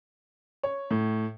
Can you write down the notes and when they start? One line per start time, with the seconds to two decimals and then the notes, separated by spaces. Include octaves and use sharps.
0.63 C#5
0.91 A2